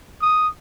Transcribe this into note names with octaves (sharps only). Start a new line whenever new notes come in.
D#6